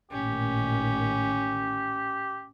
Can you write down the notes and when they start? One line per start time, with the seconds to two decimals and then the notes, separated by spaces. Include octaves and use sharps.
0.12 A1 A#2 D#3 C#4 G4